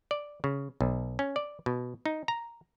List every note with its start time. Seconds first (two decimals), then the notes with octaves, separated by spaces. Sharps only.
0.11 D5
0.44 C#3
0.81 B1
1.19 C#4
1.36 D5
1.66 B2
2.06 D#4
2.28 A#5